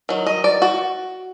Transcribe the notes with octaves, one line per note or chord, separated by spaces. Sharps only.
D#3 F#3
D#5
D5
F#4